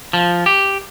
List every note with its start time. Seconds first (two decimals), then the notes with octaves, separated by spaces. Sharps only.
0.13 F3
0.46 G4